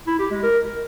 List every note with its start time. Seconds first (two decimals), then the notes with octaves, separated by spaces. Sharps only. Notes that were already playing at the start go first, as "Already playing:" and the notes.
0.07 E4
0.19 G4
0.31 G#3
0.43 A#4